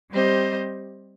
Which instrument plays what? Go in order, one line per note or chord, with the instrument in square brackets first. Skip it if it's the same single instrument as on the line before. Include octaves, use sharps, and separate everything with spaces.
[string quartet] G3 C4 G4 C5 D#5